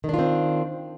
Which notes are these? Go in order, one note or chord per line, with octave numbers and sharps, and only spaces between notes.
D#3 C4 D4 F4